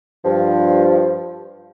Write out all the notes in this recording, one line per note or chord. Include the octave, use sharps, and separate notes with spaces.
G2 F3